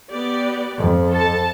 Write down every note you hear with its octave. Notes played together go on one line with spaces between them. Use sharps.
B3 G4 D5
F2
A4 A5